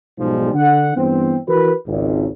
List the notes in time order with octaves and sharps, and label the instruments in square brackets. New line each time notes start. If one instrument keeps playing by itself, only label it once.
[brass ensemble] B1 G#2 B2 F3 G3 G#3
D3 F#5
G2 E3 B3 C4
E3 F#4 A#4 B4
G#1 C#2